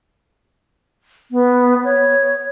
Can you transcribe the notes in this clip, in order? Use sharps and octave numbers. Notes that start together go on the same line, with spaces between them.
B3
C#5